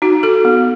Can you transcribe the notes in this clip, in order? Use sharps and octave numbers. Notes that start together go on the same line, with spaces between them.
D#4 F#4
F#4 A4
B3